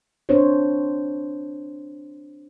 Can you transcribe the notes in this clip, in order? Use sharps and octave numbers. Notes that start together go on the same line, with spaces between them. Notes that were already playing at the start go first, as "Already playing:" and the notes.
C4 D4 A#4 C5 C#5